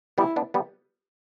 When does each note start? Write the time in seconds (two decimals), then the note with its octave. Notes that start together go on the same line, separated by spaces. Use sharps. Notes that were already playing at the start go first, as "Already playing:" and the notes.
0.18 G3 B3 E4
0.36 B3 D4
0.54 G3 B3